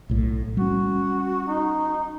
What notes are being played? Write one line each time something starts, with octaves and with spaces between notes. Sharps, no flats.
B1 A2
G3 C#4 F#4
D#4